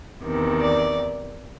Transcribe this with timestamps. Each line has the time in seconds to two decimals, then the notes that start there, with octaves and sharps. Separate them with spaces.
0.23 E2 C3 D#3
0.60 D5